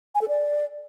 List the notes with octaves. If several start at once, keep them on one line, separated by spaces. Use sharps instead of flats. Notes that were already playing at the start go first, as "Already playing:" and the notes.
G#5
A4
D5